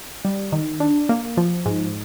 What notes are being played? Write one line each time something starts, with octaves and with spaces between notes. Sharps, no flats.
G3
D#3
D4
A#3
F3
G#2